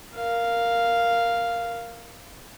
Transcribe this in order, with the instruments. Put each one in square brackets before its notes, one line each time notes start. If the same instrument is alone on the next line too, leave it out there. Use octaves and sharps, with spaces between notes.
[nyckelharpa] A#4 F5